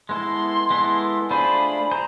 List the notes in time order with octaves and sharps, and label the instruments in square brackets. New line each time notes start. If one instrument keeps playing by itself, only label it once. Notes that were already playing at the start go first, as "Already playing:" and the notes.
[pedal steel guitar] G#3 B3 E4 A4 [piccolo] C6
[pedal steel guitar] G#3 B3 E4 A4
[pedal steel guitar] A3 D4 F4 G#4 C5 [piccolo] B5
[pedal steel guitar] G#4 C5 [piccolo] A#5